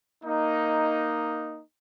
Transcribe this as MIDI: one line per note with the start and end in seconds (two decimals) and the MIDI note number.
0.24 1.61 58
0.24 1.61 63